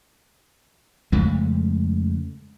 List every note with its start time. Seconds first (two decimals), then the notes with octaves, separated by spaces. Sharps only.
1.12 F2 C#3 G#3 A3